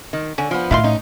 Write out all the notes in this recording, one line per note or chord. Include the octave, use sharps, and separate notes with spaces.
D#3
D3 C#4
F3 B3
A2 D#3 E4 F4 F5 C6
C#4 D#4